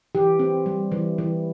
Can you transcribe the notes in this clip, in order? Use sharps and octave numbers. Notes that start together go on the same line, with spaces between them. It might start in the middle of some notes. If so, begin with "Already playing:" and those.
E3 G4
C4
G3
E3
E3